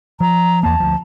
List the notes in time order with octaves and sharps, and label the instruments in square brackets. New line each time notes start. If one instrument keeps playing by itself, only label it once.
[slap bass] F3 [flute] A#5
[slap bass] E2 A#3 [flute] A5
[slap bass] D2 F3